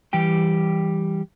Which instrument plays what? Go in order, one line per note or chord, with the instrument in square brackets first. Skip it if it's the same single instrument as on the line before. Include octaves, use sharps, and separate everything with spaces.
[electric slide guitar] E3 G3 G4 G5